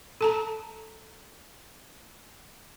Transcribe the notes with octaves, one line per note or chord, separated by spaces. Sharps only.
A4 A5 A#5